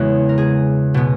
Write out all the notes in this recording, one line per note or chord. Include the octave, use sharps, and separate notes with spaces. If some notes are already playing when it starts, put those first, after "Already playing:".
Already playing: E2 C#3 E3 G#3 B3 F#4
A#4
G#4
B2 G#3 B3